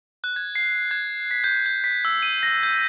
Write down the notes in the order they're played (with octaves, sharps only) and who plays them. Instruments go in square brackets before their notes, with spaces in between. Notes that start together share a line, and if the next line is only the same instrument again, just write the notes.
[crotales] F#6
G#6
C7
G#6
B6
G6
G6
B6
E6
D#7
A#6
G6